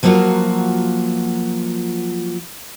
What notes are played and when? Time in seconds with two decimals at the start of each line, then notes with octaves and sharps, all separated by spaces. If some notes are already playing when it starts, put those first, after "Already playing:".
0.03 F3 F#3 A#3 B3 F4 F#4